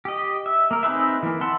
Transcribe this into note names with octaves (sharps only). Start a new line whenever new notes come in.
G4 D#5
E5
A#3 A#4
C4 D#4 G#4 B4 E5
E3 A#3
E5 F#5 A5 C6